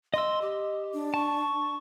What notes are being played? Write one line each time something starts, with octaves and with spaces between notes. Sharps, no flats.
D#5 C6 E6
G4
D4
A5 C#6